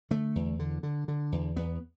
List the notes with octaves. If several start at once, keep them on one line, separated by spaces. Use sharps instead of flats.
D3 A3
E2
D3
D3
D3
E2
E2 B3